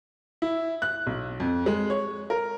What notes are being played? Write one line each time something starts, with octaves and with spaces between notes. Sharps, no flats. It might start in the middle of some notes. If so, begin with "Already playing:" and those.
E4
F#6
B1
F2
G#3
C#5
A#4